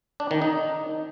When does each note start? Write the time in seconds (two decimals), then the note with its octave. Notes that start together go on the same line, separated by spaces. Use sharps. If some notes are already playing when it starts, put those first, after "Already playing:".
0.20 D4
0.31 D#3
0.42 D#4